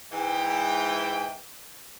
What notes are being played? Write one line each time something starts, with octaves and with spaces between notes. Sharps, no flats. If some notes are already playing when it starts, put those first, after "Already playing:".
G#2 E3 G5